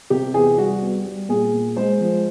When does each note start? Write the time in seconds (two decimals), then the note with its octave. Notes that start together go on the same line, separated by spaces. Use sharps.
0.10 C3 G4
0.34 E2 G#4
0.57 G3 F#4
0.82 B3
1.05 G3
1.29 A#2 G#4
1.53 A#2
1.76 G#3 C5
2.01 F3